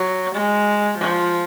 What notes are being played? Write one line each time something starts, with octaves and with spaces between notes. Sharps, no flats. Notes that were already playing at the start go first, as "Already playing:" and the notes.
Already playing: F#3
G#3
F3